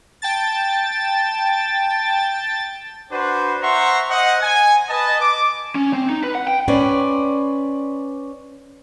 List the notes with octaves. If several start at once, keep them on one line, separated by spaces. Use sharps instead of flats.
G5 A5 A6
D4 F#4 B4 C5
C5 E5 F#5 A#5 C6 C#6
C5 D#5 F#5
G#5
B4 D#5 A5
D6
C#4
C4
D#4
B4
F#5
G5
C#4 B4 C5 D5